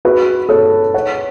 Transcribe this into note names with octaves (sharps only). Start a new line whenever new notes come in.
F#4 B4
A4 C#5
C#5 F#5